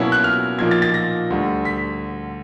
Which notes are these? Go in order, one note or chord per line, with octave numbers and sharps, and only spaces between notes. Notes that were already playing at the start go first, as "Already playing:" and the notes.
Already playing: B2 F#3 A#3 C#4 E4
F#6
F6
A#2 F3 A#3 D#4 G#6
A6
A6
A#6
D2 D3 G3
B6